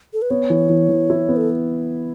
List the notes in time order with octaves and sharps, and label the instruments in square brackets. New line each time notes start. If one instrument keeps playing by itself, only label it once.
[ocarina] A4
B4
[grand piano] B3 [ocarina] C#5
[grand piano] E3
E3
E3
E4
B3
[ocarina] A4